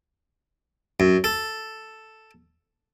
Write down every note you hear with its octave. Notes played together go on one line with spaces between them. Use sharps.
F#2
A4